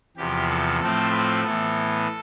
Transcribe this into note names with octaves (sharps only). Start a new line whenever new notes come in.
E2 C3 F3 G4
A4
A2 F3 A3 C4 A4
B4
A2 E3 B3 A4